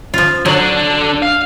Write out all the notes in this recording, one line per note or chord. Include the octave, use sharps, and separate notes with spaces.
F3 F4
D3 F#3 D4
F5